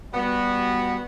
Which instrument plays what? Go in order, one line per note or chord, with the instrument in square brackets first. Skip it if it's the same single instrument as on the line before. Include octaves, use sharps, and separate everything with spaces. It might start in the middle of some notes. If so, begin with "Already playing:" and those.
[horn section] G3 B3 F#4